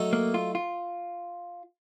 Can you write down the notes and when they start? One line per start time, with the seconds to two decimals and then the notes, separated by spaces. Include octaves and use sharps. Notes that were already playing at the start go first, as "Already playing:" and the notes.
Already playing: F#3 A3 D#4 A4
0.13 A#3
0.34 F4
0.55 F4